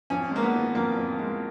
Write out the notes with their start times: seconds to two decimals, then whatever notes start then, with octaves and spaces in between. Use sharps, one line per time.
0.10 F2 C#4
0.31 G#3 A#3
0.43 B3
0.54 D#3
0.75 F2 A#3
0.97 F2
1.19 G#3